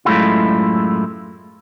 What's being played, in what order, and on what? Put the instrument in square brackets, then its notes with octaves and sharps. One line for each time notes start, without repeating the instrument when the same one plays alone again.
[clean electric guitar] F#2 A2 G#3 A3 E4 F4